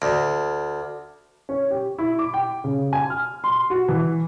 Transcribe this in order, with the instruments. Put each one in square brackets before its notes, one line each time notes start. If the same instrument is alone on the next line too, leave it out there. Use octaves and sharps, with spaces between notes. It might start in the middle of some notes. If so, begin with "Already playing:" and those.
[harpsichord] D2
[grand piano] C#4
G4
E4
D6
G5
C#3
G#5
F6
C6
F#4
E3